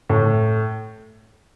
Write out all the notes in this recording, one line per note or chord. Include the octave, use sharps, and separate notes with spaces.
A2